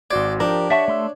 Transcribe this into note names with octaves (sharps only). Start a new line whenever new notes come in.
G#1 F#4 C5 D5 G#6
F3 D4 G4 A#4
G4 C#5 D5 E5 F#5 A5 C#6
A3 C6 E6